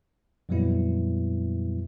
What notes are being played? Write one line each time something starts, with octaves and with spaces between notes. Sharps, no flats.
F2 A#2 F#3 G3 B3 E4